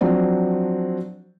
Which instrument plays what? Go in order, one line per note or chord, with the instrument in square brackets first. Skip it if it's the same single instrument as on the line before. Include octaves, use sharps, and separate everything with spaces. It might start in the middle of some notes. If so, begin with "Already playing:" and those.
[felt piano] F3 F#3 C4 D4